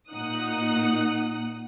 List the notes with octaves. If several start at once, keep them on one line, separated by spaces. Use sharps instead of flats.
A#2 D#4 F#5 D#6 F#6